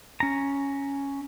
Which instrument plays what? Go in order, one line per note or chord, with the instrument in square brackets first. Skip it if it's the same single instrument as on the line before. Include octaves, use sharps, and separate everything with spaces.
[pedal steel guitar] C#4 A#5